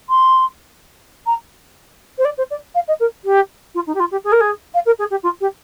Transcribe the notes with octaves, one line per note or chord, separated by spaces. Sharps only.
C6
A#5
C5
D5
C5
D5
F5
D#5
A#4
G4
F4
D#4
G4
F4
G4
G#4
A#4
G#4
F5
A#4
G#4
G4
F4
G4